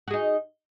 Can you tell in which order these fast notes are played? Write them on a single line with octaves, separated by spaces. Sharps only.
F#4 G#4 D#4